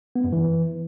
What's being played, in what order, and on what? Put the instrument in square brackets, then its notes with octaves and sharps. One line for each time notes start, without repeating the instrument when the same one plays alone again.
[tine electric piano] B3
F#2
E3